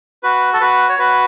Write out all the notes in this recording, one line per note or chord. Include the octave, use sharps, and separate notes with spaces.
F#4 B4
A4
F#4 B4
C#5
F#4 B4